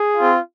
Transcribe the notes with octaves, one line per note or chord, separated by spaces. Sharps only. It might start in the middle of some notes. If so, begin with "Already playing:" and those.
Already playing: G#4
C4 F4